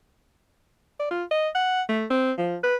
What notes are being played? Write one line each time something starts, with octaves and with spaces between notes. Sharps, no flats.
D5
F4
D#5
F#5
A3
C4
F3
B4